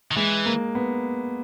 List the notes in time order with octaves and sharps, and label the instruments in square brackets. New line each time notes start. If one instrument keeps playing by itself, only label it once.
[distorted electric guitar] D#3
[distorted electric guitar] E3 [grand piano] G#3
[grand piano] A#3
B3